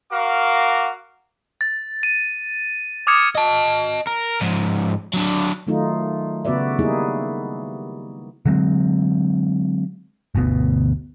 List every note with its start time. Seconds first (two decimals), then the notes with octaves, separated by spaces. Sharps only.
0.12 F#4 A#4 F5 D6
1.61 A6
2.03 D#7
3.07 D6 D#6 F6 G#6 C#7
3.35 D#5 A5
4.07 A#4
4.41 G#2 F3
5.13 F#3 D4
5.67 D#3 F#3 A3 D#4 F4
6.45 C#3 B3 F#4 B4 D5 E5
6.79 G3 A#3 B3 D#4 E4 G#4
8.45 D3 F#3 G#3 C4
10.35 G1 D2 B2 B3